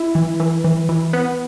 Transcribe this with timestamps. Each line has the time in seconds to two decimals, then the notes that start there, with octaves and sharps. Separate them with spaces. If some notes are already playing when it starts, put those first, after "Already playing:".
Already playing: E4
0.15 E3
0.40 E3
0.64 E3
0.89 E3
1.13 B3